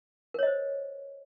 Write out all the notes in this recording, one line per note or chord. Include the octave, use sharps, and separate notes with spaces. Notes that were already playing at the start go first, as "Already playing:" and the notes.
A#4 C5 C#5 D#5